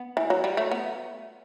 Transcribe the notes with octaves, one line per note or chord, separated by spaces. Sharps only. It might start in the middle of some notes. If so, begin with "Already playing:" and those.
Already playing: B3
E3
F#3
G3
A3
B3